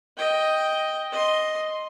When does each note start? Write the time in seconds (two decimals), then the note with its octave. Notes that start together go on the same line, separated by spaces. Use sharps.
0.17 D#5 G5
1.12 D#5 C6